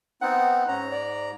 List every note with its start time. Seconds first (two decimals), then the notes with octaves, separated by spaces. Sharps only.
0.22 B3 C4 D#4 F#5
0.68 G#2 C#4 A#5
0.91 D5